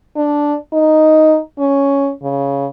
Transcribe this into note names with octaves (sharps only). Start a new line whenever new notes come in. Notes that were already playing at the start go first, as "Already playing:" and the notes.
D4
D#4
C#4
C#3